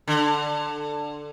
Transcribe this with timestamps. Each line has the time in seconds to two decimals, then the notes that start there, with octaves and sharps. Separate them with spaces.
0.07 D3